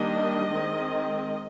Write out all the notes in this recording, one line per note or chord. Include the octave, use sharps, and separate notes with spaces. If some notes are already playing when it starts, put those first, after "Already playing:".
Already playing: D#3 G3 A#3 D4 D#5
D#3 G#3 C4